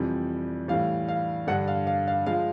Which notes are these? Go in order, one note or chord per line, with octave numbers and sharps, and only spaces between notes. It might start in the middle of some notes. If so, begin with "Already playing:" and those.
Already playing: F2 C3 E3 G3
A2 E3 G3 F5
F5
G2 D3 G3 F#5
F5
F5
F5
F3 G#3 F5